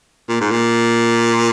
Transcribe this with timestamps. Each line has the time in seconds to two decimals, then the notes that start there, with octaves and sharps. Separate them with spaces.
0.29 A#2
0.41 G#2
0.51 A#2